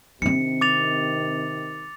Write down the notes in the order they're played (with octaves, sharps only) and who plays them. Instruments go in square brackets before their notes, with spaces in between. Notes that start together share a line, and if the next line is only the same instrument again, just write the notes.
[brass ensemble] C3 D#3 [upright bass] C4 D4 [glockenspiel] C#7
[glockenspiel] D6 A6 F7